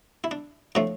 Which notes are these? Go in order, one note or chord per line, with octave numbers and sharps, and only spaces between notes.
E4
D4
A2 F3 A3 D4